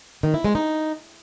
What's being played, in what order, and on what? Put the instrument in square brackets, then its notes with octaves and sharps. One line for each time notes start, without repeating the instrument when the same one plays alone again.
[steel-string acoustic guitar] D#3
E4
G#3
D#4